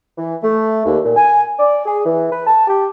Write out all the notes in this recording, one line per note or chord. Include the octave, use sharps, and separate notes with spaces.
E3
A3
D#2
A#2
G#5
D5
G#4
E3
B4
A5
G4